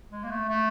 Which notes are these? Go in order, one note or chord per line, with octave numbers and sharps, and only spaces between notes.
G#3
A#3
A3
A3